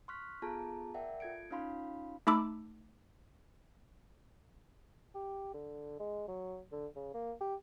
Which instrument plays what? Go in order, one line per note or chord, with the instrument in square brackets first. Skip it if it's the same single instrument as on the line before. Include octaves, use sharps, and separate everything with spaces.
[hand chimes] C6 C#6 F6 F#6 B6
B3 F4 G#4 A4 A5 A#5
A#4 D5 E5 F#5 G5
F4 A4 G#6 C#7 D7
C#4 D#4 F4 F5 B5 C6
[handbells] A3 D#4 A5 B5 D6 E6
[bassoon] G4
D3
G#3
F#3
D3
C#3
A#3
G4